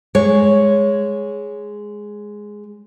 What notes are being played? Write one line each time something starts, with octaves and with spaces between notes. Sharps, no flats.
G#3 C#5